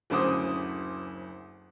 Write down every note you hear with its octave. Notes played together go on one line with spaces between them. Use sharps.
F#1 D2 C#4 C5 D6 D#6